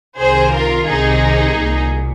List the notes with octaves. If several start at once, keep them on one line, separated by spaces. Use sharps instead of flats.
C2 C3 D#3 G#4 C5
F4 A#4
C2 C3 D#3 D#4 G#4
C2 A#2